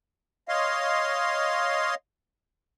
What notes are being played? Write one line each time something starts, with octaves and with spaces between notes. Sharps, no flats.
C#5 D#5 F5 C6